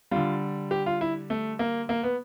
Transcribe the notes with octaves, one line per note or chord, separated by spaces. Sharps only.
D3 G3 F4
G4
F4
E4
A3
A#3
A#3
B3